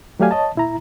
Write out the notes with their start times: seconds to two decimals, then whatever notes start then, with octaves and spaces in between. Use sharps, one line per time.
0.20 F#3 A3 G4 D5 F5 G#5
0.31 C#5 D#5 A5
0.55 A#2 E4 A#5